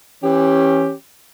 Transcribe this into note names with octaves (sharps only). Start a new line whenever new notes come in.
E3 C#4 G4